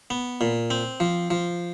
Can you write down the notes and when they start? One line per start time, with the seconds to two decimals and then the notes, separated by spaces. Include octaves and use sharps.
0.10 B3
0.41 A#2
0.70 C4
1.00 F3
1.31 F3